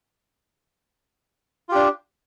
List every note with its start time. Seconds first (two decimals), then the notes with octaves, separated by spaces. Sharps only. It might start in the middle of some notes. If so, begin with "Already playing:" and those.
1.69 F4
1.72 G4
1.75 D4